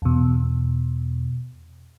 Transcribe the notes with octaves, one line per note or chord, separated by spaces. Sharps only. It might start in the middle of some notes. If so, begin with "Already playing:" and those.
E2 B2